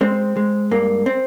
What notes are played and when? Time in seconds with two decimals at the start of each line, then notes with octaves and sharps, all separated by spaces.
0.01 G#3 C4
0.37 G#3
0.71 G2 A#3
1.06 C4